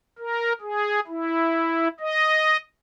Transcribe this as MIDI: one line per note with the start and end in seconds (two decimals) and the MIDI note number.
0.18 0.53 70
0.61 1.00 68
1.07 1.88 64
2.00 2.57 75